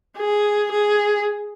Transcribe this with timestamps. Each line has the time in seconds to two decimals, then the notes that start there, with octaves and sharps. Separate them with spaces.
0.18 G#4
0.72 G#4